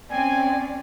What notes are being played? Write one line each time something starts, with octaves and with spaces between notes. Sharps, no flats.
C4 C#4 D5 G5 G#5